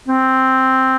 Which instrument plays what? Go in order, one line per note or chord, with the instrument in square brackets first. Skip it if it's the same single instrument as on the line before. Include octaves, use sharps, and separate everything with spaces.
[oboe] C4